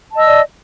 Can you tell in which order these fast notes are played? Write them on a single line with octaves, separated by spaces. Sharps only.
A5 D#5 E6 D5